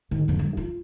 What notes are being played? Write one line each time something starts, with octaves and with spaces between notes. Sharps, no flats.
G#2 D#3
F2 D3
G2
F4